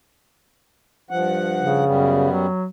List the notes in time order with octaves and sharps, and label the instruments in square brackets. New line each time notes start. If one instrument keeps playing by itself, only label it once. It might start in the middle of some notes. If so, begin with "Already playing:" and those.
[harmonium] G2 F3 F#5
[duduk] C#3
[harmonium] F#2 G3 B3
[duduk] F#3